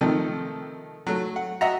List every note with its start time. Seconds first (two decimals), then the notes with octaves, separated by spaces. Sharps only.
0.01 C3 D#3 F3 A3 A4
1.07 F#3 A3
1.36 F#5
1.61 F#4 D#5 E5 F#5 A#5